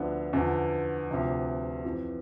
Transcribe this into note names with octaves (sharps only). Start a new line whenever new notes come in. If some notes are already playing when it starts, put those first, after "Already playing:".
Already playing: D2 D3 F3 B3 D4
E2 D3 F3
D2 C3 F3
F2 E3